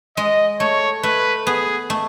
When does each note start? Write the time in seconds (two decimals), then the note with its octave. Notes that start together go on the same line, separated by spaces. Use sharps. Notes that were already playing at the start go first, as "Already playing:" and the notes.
0.17 G#3 D#5
0.60 A3 C#5
1.03 A3 B4
1.47 B3 G#4
1.90 A3